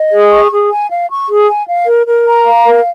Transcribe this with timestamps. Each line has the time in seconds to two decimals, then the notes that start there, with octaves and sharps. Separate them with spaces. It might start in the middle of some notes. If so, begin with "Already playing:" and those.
Already playing: D#5
0.12 G#4
0.31 C#6
0.51 G#4
0.70 G#5
0.90 F5
1.09 C#6
1.29 G#4
1.48 G#5
1.67 F5
1.87 A#4
2.07 A#4
2.26 A#5
2.45 F5
2.65 A#4